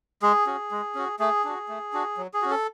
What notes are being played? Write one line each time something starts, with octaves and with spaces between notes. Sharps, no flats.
G#3 G#4
C#4 F#4
G#3
C#4 F#4
A3 G#4
D4 F#4
A3
D4 F#4
F#3
G#4
C#4 F#4
A4